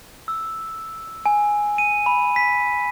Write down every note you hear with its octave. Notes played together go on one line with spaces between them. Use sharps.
E6
G#5
D#7
B5
B6